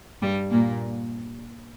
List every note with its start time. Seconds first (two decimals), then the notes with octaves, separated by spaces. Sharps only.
0.22 G2 G3
0.51 A#2 A#3